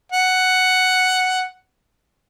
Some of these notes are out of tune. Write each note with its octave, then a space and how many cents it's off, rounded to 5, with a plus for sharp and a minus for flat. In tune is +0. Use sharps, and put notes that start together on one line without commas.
F#5 +5